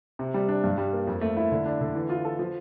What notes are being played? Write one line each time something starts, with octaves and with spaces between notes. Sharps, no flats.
C3
G3
D4
G2
G3
A#3
F2
A3
E4
D3
D4
D3
E3
F4
A4
F3